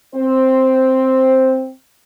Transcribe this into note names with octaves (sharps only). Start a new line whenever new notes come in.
C4 C5